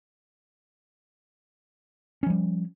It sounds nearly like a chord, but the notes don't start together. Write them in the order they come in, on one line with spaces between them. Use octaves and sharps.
C#4 F3 G3